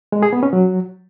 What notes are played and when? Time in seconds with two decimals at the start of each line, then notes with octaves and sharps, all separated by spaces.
0.12 G#3
0.23 G#4
0.33 B3
0.43 C#4
0.53 F#3